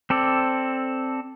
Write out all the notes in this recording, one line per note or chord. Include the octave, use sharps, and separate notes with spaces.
C4 A4 D5